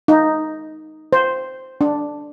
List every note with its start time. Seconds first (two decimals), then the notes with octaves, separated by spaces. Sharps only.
0.08 D#4
1.13 C5
1.81 D4